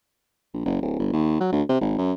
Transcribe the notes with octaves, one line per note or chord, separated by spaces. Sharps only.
A#1
F#1
D1
G1
D#2
F#3
D2
C3
G#1
F#2